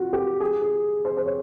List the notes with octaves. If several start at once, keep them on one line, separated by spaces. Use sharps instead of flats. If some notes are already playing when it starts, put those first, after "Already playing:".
Already playing: F4 F#4
G4
G#4
G#4
C5
C5
C#5